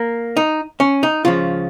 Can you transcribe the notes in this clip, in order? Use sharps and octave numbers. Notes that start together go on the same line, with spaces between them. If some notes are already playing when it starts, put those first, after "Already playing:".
Already playing: A#3
D#4
C#4
D#4
C#2 C#3 F3 F4